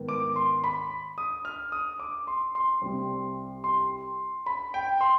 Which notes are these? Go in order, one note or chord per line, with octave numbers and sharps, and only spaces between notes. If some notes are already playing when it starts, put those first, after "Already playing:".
Already playing: G#2 D#3 B3
D6
C6
B5
D#6
F6
D#6
D6
C6
C6
C2 C3 G3 C4
C6
B5
G5
C6